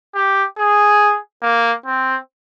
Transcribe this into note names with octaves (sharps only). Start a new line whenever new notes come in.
G4
G#4
A#3
C4